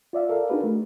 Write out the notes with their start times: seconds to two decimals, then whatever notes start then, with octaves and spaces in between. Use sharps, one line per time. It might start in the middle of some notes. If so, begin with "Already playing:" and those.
0.13 F4 D5 E5 F5
0.29 A4 A#4 D5 F5
0.50 D4 D#4 F#4 G#4 A#4 B4
0.64 A3